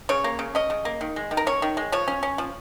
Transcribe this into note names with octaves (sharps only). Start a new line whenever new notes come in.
C#3 C#5
A#3
C#3
C#4 D#5
C#3
A#3
D#3
G#3
D#3
A#4
C#4 C#5
D#3
G#3
F3 C#5
C#4
C#4
F3